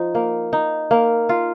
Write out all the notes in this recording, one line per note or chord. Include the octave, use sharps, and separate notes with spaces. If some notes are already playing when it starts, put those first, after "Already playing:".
Already playing: F3 D#4
A#3
D#4
A#3
F4